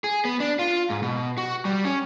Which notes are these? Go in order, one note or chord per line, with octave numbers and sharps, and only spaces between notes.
G#4
B3
D4
F4
G#2
B2
F#4
G3
C#4